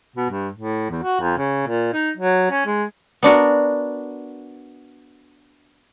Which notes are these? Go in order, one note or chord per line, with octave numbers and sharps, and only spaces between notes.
B2
G2
A2
E2
F#4
F2
C#3
A#2
D#4
F#3
C#4
G#3
B3 D4 F#4 A#4